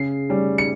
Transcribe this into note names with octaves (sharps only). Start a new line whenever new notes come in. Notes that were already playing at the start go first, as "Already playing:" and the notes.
Already playing: C#3 C7
G3 C#4
C#7